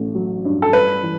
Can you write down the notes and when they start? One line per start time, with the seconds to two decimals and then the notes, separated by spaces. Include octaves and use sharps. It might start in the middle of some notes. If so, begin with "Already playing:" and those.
Already playing: A1 A3
0.15 F#3
0.45 G2
0.62 A4
0.73 G3 B4
1.03 E3